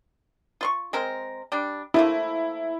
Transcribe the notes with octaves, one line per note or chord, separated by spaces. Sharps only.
F4 C6 C#6
G#3 C4 A#4
G3 D4
F3 A3 A#3 E4